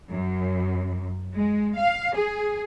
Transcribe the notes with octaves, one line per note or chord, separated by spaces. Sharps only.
F#2
G#3
F5
G#4